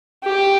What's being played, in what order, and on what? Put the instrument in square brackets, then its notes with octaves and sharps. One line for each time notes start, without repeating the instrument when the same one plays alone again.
[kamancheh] G4